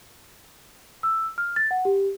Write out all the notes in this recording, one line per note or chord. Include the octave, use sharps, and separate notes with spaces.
E6
F6
A6
F#5
G4